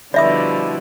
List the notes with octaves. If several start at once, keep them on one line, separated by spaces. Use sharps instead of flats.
B2 D3 F3 G3 E4 D5 E5 D#6